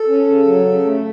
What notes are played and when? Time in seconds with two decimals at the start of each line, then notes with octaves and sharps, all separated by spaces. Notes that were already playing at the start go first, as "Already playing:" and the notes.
Already playing: A4
0.08 C#4
0.27 C#3
0.46 F#3
0.65 C#3
0.84 A3